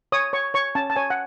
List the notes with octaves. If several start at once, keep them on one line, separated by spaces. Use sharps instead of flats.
C#5 D#6
C#5 C#6
C#5 C#6
C#4 A5
A5
C#5 G#5
F#5